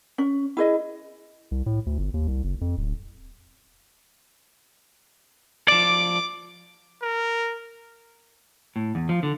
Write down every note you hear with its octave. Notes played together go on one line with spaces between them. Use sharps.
C#4
E4 G#4 D#5
C2
A2
D2
G1
D#2
C2
F#1
F2
D1
F3 D5 D6
A#4
A2
E2
F3
D3